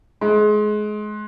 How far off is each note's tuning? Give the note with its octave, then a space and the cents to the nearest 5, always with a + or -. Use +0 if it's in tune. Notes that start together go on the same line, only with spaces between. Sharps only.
G#3 +25